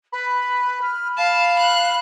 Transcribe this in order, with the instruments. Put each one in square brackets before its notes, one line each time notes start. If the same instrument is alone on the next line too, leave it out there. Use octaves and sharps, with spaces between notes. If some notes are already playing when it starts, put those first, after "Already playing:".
[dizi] B4 [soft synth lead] B5
[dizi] F6
[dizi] F5 [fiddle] A5
[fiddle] F#6